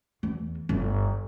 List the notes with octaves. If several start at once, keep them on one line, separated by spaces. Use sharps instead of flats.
E2
G1